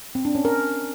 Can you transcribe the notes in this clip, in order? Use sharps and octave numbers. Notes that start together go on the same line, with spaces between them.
C4
D4
C#4
A#4